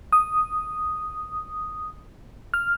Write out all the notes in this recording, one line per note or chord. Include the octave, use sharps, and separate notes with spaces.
D#6
F6